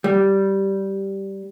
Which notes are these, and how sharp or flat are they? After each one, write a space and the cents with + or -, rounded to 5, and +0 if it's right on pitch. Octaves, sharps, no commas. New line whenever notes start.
G3 -10